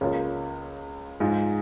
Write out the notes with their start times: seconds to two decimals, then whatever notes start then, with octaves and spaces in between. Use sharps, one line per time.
0.01 C#2 C#3 A#3 F4
1.20 G#2 G#3 F4